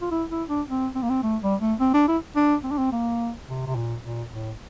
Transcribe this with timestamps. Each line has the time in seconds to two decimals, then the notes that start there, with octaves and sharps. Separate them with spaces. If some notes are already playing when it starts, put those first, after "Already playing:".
0.01 F4
0.11 E4
0.30 E4
0.48 D4
0.68 C4
0.95 C4
1.02 A#3
1.10 C4
1.23 A3
1.42 G3
1.61 A3
1.80 C4
1.94 D4
2.08 E4
2.36 D4
2.63 C4
2.71 D4
2.78 C4
2.92 A#3
3.48 C3
3.66 C3
3.75 A#2
4.03 A#2
4.31 A2